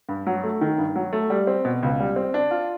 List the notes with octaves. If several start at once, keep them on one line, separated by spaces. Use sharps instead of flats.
G2
F#3
A3
D#3
G2
F#3
A3
G3
C4
B2
C#2
G3
C4
D4
F4